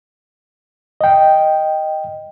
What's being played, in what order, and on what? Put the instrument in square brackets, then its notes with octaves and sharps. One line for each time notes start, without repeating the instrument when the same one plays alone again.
[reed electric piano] D#5 G5